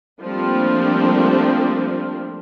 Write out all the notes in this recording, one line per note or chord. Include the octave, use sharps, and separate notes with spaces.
F3 G3 A3 A#3 C4 D4